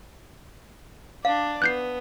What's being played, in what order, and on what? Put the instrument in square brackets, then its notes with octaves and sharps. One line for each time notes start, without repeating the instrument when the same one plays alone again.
[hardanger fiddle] D4 D5 [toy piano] F5
[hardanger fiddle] B3 [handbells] F#6 G6 C7